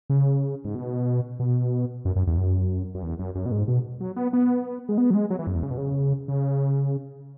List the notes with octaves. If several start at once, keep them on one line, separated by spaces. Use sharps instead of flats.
C#3
G#2
B2
B2
F#2
F#2
E2
F#2
F#2
E2
F#2
F#2
B2
G#2
B2
F#3
B3
B3
G#3
B3
F#3
G#3
F#3
E3
F#2
E2
C#3
B2
C#3
C#3